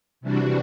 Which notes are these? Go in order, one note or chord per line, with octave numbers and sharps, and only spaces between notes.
C3 E3 G3 D4 F#4